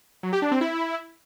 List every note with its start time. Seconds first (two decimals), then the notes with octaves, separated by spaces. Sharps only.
0.23 F#3
0.33 G4
0.42 D4
0.51 C4
0.61 E4